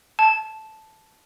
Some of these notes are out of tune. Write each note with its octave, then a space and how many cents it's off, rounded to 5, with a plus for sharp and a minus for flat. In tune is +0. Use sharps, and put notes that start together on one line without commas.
A5 -10